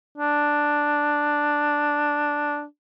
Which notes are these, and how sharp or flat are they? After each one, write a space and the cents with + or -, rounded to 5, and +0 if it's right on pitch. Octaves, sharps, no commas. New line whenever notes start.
D4 +0